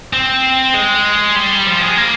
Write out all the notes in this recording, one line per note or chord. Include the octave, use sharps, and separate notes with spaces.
C4
G#3
G3
F3
G#3
A#3